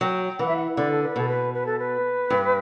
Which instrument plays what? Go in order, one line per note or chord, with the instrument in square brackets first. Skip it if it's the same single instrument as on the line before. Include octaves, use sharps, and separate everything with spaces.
[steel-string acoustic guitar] F#3 [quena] G5
[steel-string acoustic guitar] E3 [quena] F#5
[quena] E5
F#5
[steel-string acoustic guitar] D3 [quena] D5
[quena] A4
B4
[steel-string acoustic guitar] B2 [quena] A4
[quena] B4
B4
A4
B4
[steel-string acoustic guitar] G2